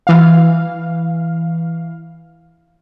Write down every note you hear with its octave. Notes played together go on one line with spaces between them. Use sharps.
E3 F5